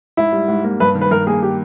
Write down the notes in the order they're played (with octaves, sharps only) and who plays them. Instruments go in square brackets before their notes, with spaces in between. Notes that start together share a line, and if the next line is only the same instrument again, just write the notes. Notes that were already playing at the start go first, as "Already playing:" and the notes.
[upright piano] G#2 [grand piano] E4
[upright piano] G3
G#2
A#3
[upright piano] G2 [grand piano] B4
[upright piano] D#3
[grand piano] B4
[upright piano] G2 [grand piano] A#4
[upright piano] A#3 [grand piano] G#4
[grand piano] G4